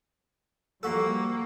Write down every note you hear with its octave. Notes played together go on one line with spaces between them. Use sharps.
F3 G3 A#3 F#4 A4